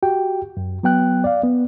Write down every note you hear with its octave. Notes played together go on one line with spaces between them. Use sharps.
F#4 G4 G5
F#2
F#3 B3 G5 F#6
D5 F5
B3